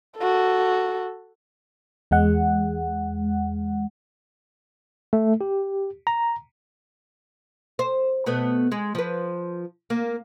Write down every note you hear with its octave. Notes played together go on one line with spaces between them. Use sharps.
F#4 A4
E2 G#3 F#5
A3
G4
A#5
C5
B2 A3 B3
G#3
F3 B4
A#3